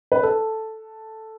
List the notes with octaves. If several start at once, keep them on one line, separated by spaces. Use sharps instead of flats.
B4
A4